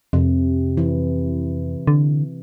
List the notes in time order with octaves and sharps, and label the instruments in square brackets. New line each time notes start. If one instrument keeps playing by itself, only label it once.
[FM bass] F2 [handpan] C3
[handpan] E3
[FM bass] D3